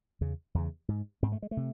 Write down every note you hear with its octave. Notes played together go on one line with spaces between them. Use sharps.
E2 C#3
E2 C#3
G#2
G#2 C4
A3
G#3
A3
C3